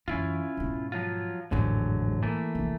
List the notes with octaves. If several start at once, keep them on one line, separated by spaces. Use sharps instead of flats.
F#2 E3 C#4 E4 F4
G#2 B2
F3 F#3 F4
A1 F2 G#2 D3 F#3
E3 A3 A#3
C3 F3